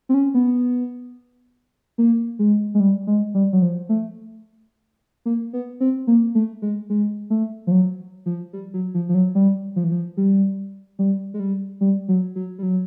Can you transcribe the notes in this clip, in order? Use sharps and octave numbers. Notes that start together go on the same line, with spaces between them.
C4
C#4
B3
A#3
G#3
G#3
G3
G#3
G3
F#3
F3
A3
A#3
B3
C4
A#3
A3
G#3
G#3
A3
F3
F#3
F3
G3
F#3
F3
F3
F#3
G3
F3
E3
F3
G3
G3
G#3
G3
G3
F#3
F#3
G3
F#3